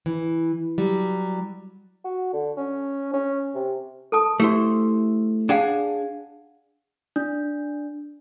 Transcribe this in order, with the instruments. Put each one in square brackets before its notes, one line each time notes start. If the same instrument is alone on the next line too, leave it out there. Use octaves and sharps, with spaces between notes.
[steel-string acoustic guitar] E3
F#3 G3
[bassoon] F#4
D3
C#4
C#4
C3
[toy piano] A4 A5 D#6
[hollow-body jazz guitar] A3 E4 C5 [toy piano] G4
[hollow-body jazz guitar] D4 G#4 [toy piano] F5 F#5 G#5
[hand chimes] D4